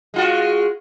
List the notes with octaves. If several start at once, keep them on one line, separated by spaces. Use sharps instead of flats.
G#3 F4 F#4